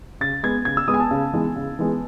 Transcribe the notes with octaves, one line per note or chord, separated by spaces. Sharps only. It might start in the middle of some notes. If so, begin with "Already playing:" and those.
C#3 A6
G#3 B3 G#6
C#3 G#6
E6
G#3 B3 D#6
G#5
A5
C#3
E3 G#3 B3
C#3
E3 G#3 B3